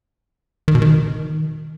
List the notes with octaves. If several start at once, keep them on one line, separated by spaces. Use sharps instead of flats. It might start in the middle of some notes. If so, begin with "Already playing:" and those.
D#3
B2
D#3